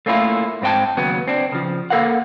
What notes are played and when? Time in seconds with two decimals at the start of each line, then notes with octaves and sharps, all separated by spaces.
0.06 A3 A#3 C#4 D4 E4 F4
0.62 G#2 C4 D4 G5 A5
0.97 D#2 C#3 F#3 B3
1.28 C4 D4
1.52 C#3 F3
1.90 A#3 A4 A#4 F5 F#5